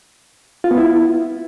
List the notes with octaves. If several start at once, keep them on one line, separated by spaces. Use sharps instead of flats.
F4
B3
E4